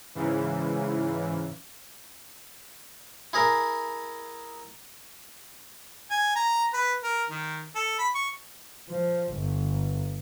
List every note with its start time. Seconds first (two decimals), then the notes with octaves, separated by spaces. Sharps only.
0.15 G#2 C#3 E3
3.33 E4 G#4 A#4
6.11 G#5
6.36 A#5
6.74 B4
7.03 A#4
7.30 D#3
7.75 A4
7.99 B5
8.15 C#6
8.90 F3
9.34 G1